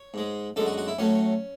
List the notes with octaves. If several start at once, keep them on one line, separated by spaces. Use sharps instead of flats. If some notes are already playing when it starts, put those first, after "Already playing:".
Already playing: C#5
G#2 G#3
F#2 D3 G#3 A4
F#4
F#4
E4
A2 F#3 A3 C#4